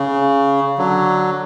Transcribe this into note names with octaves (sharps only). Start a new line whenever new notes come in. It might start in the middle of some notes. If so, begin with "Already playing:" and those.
Already playing: C#3
D3 F#3